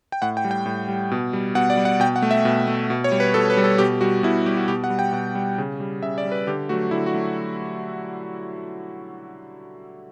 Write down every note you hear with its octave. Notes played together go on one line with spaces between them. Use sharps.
G5
A2 F#5
G5
G3
G5
A2
G3
B2
G3
B2 F#5
D5
G3
F#5
B2 G5
F#5
A3
E5
B2
A3
B2
C#5
G3
B4
B2 A4
B4
G3
A4
B2 G4
G3 F#4
B2 E4
G3 G4
F#4
B2 G4
F#5
G3
G5
B2 F#5
G3
C#3
G3
C#3 E5
D5
G3
B4
D3 G4
F#3 A3 F#4
D3 E4
F#4
F#3 A3